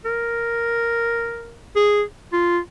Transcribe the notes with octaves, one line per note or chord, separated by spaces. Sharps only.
A#4
G#4
F4